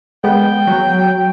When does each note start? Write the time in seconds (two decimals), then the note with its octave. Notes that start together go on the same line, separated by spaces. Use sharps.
0.24 G#3 B3 G5
0.67 F#3